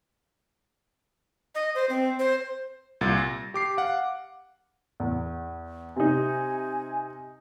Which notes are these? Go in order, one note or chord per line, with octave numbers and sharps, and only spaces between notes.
D#5
C5
C4
C5
C2 A#2 A6
A#6
G4 D6 C7
F5 F#5
E2
C3 D#4 G#5